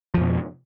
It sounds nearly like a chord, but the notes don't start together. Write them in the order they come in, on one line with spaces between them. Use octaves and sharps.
F3 F2 B2